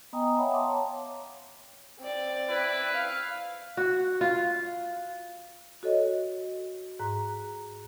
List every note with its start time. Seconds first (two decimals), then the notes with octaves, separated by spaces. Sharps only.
0.13 B3 D#5 G5 G#5 A#5 D#6
0.38 C#5 E5 F#5 G5 B5
0.53 F5 A5 A#5 C6 D6
0.68 C#5
2.00 C4 D5
2.49 E4 B4
2.94 F5
3.77 F#4
4.21 F4
5.83 F#4 A4 C#5 D#5
6.99 G#2 A#5 F#6